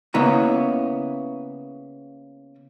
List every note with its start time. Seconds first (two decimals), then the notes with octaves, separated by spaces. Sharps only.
0.14 C#3 A#3 B3 E4 D#5 A#5